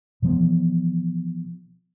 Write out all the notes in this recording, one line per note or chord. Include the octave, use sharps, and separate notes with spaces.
B2 E3 F3 B3